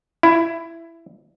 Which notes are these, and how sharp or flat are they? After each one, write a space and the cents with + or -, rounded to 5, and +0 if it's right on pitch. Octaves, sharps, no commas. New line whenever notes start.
E4 +15